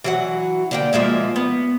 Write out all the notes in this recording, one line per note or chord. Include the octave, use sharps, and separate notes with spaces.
E3 F#3 F#5
D3 A#3 G5
F3 G#3 A#3 E5
B3